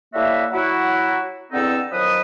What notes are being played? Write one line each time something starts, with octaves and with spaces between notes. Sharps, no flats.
A2 G3 A#3 F#4 E5
F#3 E4 F#4
E2 D3 C4 D#4 A4 E6
D#3 F3 F#3 B4 D#5 D#6